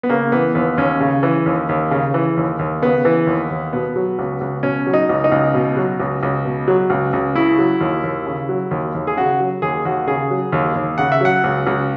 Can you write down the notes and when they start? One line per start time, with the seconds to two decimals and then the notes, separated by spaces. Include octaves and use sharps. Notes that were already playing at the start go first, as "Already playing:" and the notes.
0.03 B3
0.09 C#3 A#3
0.32 E3 B3
0.55 D#2 B3
0.77 D#2 C#4
1.00 C#3
1.23 E3
1.46 D#2
1.69 D#2
1.91 C#3
2.14 E3
2.37 D#2
2.59 D#2
2.82 C#3 B3
3.05 E3
3.27 D#2
3.50 D#2
3.73 B2 B3
3.96 F#3
4.19 C#2
4.41 C#2
4.63 B2 C#4
4.87 F#3
4.93 D#4
5.09 C#2
5.24 D#4
5.32 C#2
5.54 B2
5.77 F#3
6.00 C#2
6.23 C#2
6.45 B2
6.68 F#3
6.90 C#2
7.13 C#2
7.35 C#3 E4
7.58 F#3
7.81 D#2
8.03 D#2
8.27 C#3
8.49 F#3
8.71 D#2
8.94 D#2
9.07 G#4
9.17 C#3 F#4
9.40 F#3
9.62 D#2 G#4
9.85 D#2 F#4
10.07 C#3 G#4
10.31 F#3
10.52 D#2
10.75 D#2
10.98 C#3 F#5
11.12 E5
11.21 F#3 F#5
11.44 C#2
11.67 C#2